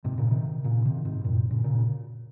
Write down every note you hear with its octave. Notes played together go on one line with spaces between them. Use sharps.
G#2 C3
A#2 C#3
C3 D#3
A#2 C#3
C3 D#3
G#2 C3
F#2 A#2
A#2 C#3
A#2 C#3